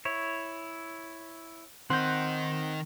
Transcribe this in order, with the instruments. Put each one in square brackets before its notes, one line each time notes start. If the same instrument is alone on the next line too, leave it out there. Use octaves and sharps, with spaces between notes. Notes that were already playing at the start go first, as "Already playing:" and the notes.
[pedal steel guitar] E4 C#5
[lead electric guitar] D#3 D#4 [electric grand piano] C4 [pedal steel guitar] F#5 [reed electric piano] C6 G6